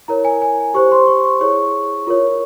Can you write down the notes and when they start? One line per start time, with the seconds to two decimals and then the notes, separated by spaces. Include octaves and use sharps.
0.08 E4 A#4 C#5 A#5
0.25 G#5
0.42 G#5
0.74 G4 C5 C#6
0.92 C6
1.08 C#6
1.24 C#6
1.41 E4 G#4 C#5 C#6
2.07 F4 A#4 C#5